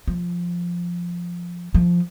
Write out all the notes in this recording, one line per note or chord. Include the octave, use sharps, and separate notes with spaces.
F3
F3